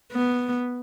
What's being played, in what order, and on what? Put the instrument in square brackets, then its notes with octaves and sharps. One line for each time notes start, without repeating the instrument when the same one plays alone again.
[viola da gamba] B3